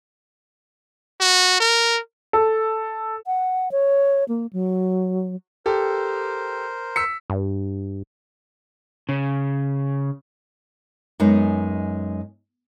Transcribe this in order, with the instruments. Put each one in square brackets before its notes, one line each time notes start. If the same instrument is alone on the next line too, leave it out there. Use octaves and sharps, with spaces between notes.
[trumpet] F#4
A#4
[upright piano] A4
[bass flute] F#5
C#5
A#3
F#3
[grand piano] G4 A4 [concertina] A#4 C5
[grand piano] E6 B6 C#7
[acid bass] G2
[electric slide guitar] C#3
[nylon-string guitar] F#2 G#3 B3 D#4